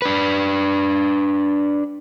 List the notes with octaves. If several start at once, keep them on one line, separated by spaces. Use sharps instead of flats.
D4 B4